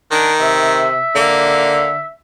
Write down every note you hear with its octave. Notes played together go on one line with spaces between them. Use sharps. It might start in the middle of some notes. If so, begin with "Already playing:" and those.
D#3 D4
C3 E5
D3 A#3